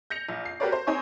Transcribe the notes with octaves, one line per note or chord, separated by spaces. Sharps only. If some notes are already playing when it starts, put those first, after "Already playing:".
G6 A#6 C#7 F7
A#1
C7
F#4 G4 A#4 B4 C#5 D5
C5
C4 D#4 C#5 G#5 C6 C#6